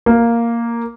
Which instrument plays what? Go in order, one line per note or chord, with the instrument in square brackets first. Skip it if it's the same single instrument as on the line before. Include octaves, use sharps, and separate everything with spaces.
[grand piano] A#3